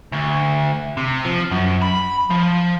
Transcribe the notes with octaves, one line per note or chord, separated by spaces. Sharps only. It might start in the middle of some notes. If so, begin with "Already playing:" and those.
D2
C3
F3
F#2
B5
F3